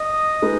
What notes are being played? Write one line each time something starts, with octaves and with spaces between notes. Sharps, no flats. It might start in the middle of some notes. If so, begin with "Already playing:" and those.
Already playing: D#5
G#3 D#4 B4